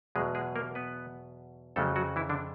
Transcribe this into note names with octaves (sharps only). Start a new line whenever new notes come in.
E2 B2 F#3 G#3 G#4
G#3 G#4
A#3 A#4
B3 B4
F2 C#3 F#3 A3 A4
F#3 F#4
E3 E4
D3 D4